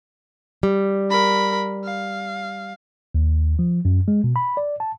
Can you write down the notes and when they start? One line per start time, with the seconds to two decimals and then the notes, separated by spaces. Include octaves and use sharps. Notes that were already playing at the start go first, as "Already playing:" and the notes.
0.63 G3
1.10 A#4 B5
1.84 F5
3.15 D#2
3.59 F3
3.85 F#2
4.08 G#3
4.24 B2
4.36 B5
4.57 D5
4.80 A5